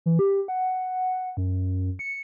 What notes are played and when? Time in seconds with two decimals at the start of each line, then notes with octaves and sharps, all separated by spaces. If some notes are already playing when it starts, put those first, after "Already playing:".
0.06 E3
0.19 G4
0.48 F#5
1.37 F#2
1.99 C#7